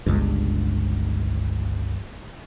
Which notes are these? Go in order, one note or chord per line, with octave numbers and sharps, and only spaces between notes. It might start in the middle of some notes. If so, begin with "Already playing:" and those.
G1 C#2 G2